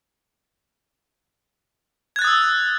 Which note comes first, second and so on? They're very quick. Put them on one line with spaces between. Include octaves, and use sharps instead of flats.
G#6 F#6 A6 D#6 E6